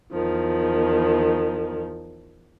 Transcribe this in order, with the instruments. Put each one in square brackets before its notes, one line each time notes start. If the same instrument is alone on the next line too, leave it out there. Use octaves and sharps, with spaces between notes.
[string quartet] E2 D#3 F3